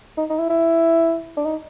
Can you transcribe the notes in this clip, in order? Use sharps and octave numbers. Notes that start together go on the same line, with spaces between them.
D#4
D#4
E4
E4
D4
D#4